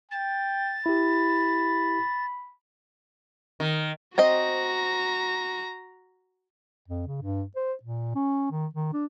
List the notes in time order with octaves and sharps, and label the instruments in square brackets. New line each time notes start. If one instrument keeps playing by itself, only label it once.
[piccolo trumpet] G5 [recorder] A6
[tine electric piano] E4 G4 [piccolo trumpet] B5
[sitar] D#3
[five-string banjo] C4 C5 D#5 [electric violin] F#4 A#5
[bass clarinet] F2
C#3
G2
C5
A#2
C#4
D#3
D#3
D4